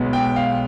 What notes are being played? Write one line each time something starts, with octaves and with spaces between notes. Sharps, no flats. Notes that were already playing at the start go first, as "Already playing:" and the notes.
Already playing: B1 B2 G#3 B3
G5
F5